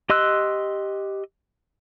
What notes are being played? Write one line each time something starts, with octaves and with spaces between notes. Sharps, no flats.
G4 D#5 C6 E6 F#6